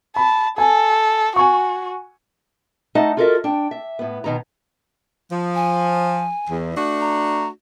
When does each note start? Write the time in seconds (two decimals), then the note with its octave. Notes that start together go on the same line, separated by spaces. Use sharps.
0.16 A5 B5
0.58 A4 G#5
1.36 F#4 G#5 C#6
2.95 A3 D#4 D#5 F#5 A5
3.17 F4 F#4 A4 A#4 D#5 E5
3.44 D4 G5
3.71 E5
3.99 A2 B3
4.24 B2 D#3 B3 A#5
5.31 F3
5.55 G#5
6.49 E2
6.76 A3 D4 F#4
7.00 A#5